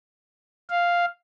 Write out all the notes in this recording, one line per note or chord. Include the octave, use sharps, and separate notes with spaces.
F5